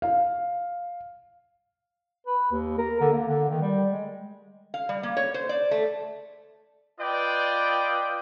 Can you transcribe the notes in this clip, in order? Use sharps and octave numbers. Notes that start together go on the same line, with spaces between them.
F5
B4
D#2
A#4
D3
A#3
D3
D#3
G3
G#3
F5
G3
A#3
C#5
C5
D5
A3
F4 B4 D5 D#5 G5